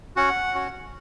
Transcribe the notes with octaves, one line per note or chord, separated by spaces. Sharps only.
C#4 F#4 F#5
C#4 F#4